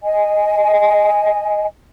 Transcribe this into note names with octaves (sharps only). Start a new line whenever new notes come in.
D#5 G#5